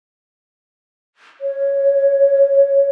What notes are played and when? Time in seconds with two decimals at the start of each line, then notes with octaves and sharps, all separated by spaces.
1.41 C#5